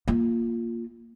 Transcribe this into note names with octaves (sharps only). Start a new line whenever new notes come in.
A#3 F4